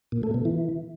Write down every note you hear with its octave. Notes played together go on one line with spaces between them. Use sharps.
A#2
A3
B2
E3